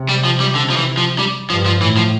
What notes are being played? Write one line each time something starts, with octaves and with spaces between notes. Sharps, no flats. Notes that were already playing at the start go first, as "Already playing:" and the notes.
Already playing: C3
G3
F3
G3
D3
F3
E3
F3
G3
G2 F3
F3
A2 E3
F3